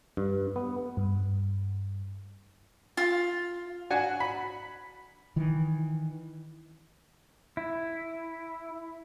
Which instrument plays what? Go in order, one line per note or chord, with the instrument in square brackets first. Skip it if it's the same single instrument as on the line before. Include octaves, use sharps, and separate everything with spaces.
[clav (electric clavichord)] G2
B3
[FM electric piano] G2
[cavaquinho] F4
[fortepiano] D4 F#4 G#5
B5
[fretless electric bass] D#3 E3
[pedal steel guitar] E4